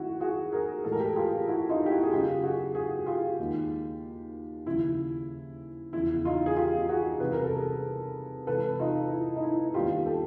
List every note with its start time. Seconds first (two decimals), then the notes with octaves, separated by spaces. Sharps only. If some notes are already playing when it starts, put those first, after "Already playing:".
Already playing: F#2 D#3 F#3 A3 E4 F#4
0.20 F#4 G#4
0.52 G#4 A#4
0.84 A2 E3 G#3 A4
0.92 A#4
1.00 G4 A4
1.12 G#4
1.16 F4 G4
1.48 E4 F#4
1.69 D#4 F4
1.86 G4
1.90 E4 F#4
2.03 G#4
2.12 F#2 C#3 F#3 F4 G4
2.43 F#4 G#4
2.75 F#4 G#4
2.99 G#4
3.06 F4 G4
3.39 D#2 D#3 G#3
4.66 D#2 C#3 F3 E4
5.93 E2 C#3 F3 E4
6.25 D#4 F4
6.46 G#4
6.56 F4 G4
6.89 F#4 G#4
7.20 C3 E3 G3 B4
7.32 A#4
7.44 A4
7.55 G#4 A#4
8.47 C3 E3 G#3 A4 B4
8.79 D#4 F4
9.11 E4
9.36 D#4
9.43 E4
9.74 D#2 D#3 G3 B3 D4 F4 G4
10.06 G4 A4